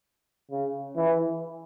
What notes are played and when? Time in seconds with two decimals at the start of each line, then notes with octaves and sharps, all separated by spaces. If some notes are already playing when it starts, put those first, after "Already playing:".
0.51 C#3
0.96 E3